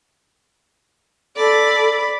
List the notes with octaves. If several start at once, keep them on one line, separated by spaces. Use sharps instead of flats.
A4 D5 B5